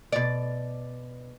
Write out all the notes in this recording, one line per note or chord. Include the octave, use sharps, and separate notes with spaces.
B2 D5